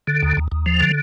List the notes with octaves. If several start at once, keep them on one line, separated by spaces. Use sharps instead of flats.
D3
D#2
D#2
D#2
F3
D3